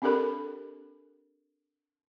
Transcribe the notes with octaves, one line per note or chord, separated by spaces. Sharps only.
C4 D4 G4 A4 A#4 B5